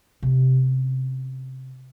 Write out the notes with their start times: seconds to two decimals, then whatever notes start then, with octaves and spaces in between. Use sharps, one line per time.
0.23 C3 C#4